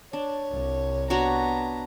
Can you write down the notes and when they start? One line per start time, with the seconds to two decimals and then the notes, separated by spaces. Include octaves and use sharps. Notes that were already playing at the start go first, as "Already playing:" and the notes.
0.13 D4 C#5
0.51 C2
1.10 B3 D4 F#4 C#5 A#5